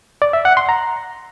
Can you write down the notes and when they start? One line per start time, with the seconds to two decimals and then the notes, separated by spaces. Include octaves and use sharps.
0.22 D5
0.33 E5
0.45 F#5
0.57 C6
0.69 A#5